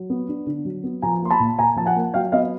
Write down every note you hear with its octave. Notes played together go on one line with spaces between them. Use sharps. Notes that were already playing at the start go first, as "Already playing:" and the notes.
Already playing: F#3
B3
D4
D3
F#3
B3
F3 G#5 A#5
A#3 C6
A5 B5
A#2
A#2 G#5 A#5
F3 A5
F#5 G#5
A#3
F#3 F5 G5
B3 D#5 F5